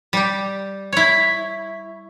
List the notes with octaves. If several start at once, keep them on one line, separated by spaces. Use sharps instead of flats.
G3 G4
E4 C#5